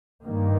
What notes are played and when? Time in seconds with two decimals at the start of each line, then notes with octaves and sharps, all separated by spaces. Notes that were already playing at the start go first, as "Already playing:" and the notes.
0.25 G2 D#3 A#3